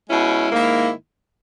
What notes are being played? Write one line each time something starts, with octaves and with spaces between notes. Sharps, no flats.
B2 G#3 C#4 E4
G#2 D#3 A#3 E4